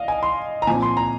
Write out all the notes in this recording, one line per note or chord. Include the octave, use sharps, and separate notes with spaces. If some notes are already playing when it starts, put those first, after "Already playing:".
Already playing: D5 D#5 F5
G#5
C6
A#5
A#2 F3 C4 G#5
C6
A#5